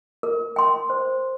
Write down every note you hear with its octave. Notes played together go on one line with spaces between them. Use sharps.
A#4
G5 C6
C5